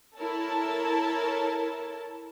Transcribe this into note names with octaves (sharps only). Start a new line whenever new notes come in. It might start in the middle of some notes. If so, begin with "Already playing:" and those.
E4 A4 A#4 C#5 A5